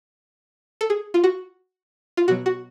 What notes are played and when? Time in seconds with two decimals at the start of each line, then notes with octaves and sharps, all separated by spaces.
0.81 A4
0.90 G#4
1.14 F4
1.24 F#4
2.17 F4
2.28 B2 F#3 F#4
2.46 F#4